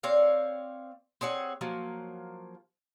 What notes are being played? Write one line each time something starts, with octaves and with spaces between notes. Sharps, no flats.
C4 C#5 D5 F5
C4 G#4 C#5 F#5
F3 F#3 A#3